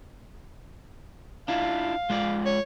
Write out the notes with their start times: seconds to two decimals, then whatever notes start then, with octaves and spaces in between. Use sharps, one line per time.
1.48 D4 E4 F4 F5
2.10 G#3 F4 D5
2.46 C#5